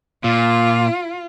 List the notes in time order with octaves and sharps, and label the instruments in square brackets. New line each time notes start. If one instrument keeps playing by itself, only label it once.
[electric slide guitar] A#2 [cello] F4